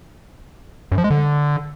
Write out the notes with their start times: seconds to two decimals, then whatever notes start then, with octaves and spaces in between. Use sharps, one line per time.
0.92 F#2
0.98 F3
1.04 G#3
1.10 D3